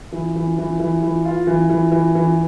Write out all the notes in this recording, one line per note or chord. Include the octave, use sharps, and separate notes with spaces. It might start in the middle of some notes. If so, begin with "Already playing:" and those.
E3
E3
E3
E3
E3
F4
E3
E3
E3
E3